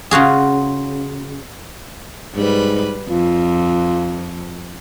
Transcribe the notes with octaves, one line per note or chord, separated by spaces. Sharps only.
C#3 F4 F#4 G#4
G#2 G3 B4
F2 F4